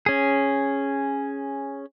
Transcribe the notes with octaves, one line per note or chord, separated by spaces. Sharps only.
C#4 G#4